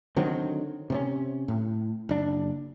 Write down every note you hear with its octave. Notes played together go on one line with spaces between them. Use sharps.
D3 D#3 F#3 C4
C3 C4 C#4
A2
F#1 D4